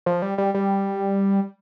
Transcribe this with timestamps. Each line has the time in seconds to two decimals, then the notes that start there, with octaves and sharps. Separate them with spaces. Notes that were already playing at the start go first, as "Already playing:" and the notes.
0.06 F3
0.22 G3
0.38 G3
0.54 G3